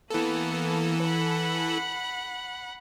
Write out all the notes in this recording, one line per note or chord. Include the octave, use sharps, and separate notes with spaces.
E3 A#3 B3 A4
F#5 B5